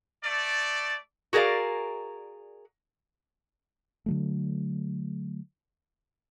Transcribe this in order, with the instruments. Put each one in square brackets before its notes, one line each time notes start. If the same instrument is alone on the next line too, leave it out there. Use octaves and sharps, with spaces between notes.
[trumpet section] A3 D5
[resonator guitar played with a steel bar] F#4 G#4 A#4 B4 D5 F5
[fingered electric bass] D3 F#3 A3